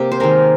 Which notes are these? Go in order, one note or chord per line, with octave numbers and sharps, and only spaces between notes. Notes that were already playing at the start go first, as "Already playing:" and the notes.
Already playing: C3 A#3 G4
C5
D#3 G#3 A#4